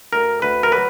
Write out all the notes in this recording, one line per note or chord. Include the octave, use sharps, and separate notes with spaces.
D2 A#4
D2 B4
A#4
F#3 B4